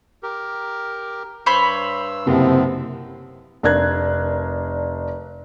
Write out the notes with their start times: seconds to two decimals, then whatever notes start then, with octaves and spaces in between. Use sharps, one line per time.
0.23 G4 A#4
1.46 G2 C5 C#5 B5 E6
2.27 F#1 C3 F3 B3 C4
3.63 F1 D4 A#4 F#6 G#6